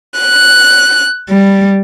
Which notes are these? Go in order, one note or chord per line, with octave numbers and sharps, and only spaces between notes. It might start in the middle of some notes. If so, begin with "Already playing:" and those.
F#6
G3